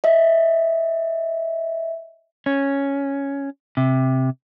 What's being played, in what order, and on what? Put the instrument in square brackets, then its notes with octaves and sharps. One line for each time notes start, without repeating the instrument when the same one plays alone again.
[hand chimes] D#5 E5
[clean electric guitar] C#4
C3